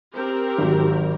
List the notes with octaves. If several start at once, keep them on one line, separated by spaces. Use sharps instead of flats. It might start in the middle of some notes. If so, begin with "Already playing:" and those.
C4 G4 A#4
G#1 F#3